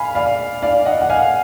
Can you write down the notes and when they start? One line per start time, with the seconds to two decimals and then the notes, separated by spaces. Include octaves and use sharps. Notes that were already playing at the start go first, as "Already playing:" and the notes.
Already playing: F5 G#5 B5
0.15 D5 F5
0.62 D5 F5
0.85 D#5 F#5
1.02 F#5
1.10 F5 G#5